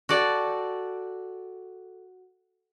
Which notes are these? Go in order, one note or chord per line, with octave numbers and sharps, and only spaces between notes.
F#4 A4 D5 G5